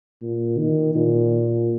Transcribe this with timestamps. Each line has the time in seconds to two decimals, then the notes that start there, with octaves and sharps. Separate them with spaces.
0.22 A#2
0.58 D#3
0.95 A#2